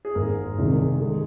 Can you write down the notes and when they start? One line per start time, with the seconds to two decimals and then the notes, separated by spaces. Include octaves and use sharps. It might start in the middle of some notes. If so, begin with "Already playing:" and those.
0.05 G#4
0.15 G#1 G#2 G#3 A#4
0.58 C2 C3 D#3 G#3 G#4
1.00 D#3 G#3